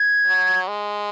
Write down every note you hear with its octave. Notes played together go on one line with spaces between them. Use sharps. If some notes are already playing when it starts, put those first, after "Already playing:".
Already playing: G#6
F#3
G#3